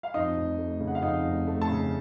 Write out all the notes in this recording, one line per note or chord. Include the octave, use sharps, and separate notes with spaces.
F5
F2 D#4 D#5
F1
A3
C#3
F#5
F5
F2 D#4 D#5
F1
A3
A4 A5
C#3